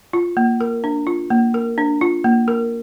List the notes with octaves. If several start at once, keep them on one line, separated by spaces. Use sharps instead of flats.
F4
A#3
A#4
D4
F4
A#3
A#4
D4
F4
A#3
A#4